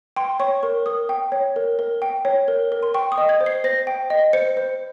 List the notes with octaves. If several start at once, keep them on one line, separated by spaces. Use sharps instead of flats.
G5 C6
C#5 C#6
A#4 C#6
A#4 D#6
G5
C#5
A#4
A#4
G5
C#5
A#4
A#4
C6
G5 C#6
D#6
D#5
G#6
C5
C7
C5 A#6
G5
D#5
C5 C#7
C5